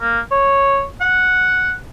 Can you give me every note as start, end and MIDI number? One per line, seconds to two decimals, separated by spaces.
0.01 0.20 58
0.31 0.84 73
1.01 1.73 78